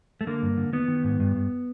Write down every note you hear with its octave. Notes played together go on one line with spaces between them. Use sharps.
A3
D3 A#3
G2
D3
D#3 B3
D#3
G#2
G2
G2